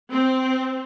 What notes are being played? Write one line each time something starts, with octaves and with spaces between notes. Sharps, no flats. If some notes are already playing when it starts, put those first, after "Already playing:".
C4